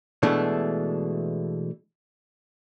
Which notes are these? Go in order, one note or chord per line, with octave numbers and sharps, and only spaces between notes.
B2 E3 G#3 A3 D4